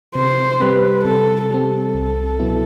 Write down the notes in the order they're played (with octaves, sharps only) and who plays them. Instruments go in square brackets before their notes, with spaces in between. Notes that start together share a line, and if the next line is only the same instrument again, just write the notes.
[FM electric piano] C3 [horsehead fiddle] C5
[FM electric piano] G3 C4 [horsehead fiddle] B4
[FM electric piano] C3 [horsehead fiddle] A4
[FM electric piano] G3 C4 [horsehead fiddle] A4
[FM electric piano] C2
B2 F#3 B3 E4